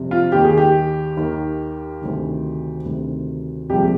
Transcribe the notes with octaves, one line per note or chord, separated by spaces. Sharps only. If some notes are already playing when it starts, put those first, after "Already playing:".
Already playing: F2 C3 G3
F4
D#2 D#3 A#3 G4
G#4
G4
D#2 D#3 A#3
D2 C3 D#3
D2 C3 D#3
C2 A#2 F3 G#3 G4